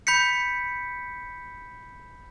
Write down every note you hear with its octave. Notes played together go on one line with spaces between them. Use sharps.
B5 G6 B6 C#7